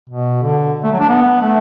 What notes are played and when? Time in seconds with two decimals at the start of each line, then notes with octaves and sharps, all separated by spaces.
0.10 B2
0.42 D3
0.84 A3
0.92 F#3
1.00 D4
1.09 B3
1.41 A3